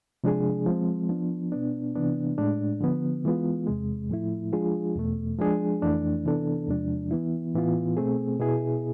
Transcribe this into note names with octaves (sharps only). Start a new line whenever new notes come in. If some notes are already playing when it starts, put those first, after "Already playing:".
C3 F3 G#3 D4 G#4
F3 G#3 C4
F3 B3 D4
B2 B3 D4
C3 E3 B3 D4
A2 G#3 D4
D3 F3 B3
E3 G#3 B3 F4
E2 C3 G#3
A2 F3 A3 E4
F3 G#3 D4 F4 G#4
E2 B2 A3
F3 G#3 D4 G#4
F2 E3 A3 D4
C3 E3 B3 D4 A4
E2 C3 F3 G#3 D4
E3 B3 E4
A2 E3 B3 F4
B2 A3 C4 G#4
B2 B3 E4 G#4